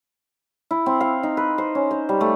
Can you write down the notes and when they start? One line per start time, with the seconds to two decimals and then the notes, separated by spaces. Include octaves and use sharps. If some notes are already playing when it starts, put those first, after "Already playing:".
0.71 E4
0.86 C4
1.00 F5
1.23 D#4
1.37 B4
1.58 C5
1.75 C#4
1.91 C5
2.09 G3
2.21 A3